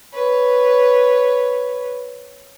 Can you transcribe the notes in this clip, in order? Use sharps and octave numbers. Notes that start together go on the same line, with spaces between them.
B4 C#5